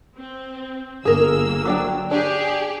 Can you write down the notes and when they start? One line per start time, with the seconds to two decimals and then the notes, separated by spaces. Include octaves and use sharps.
0.17 C4
1.05 G1 A#3 G#4 A#4 E6
1.65 F#3 D4 G5
2.11 D4 G4 G#4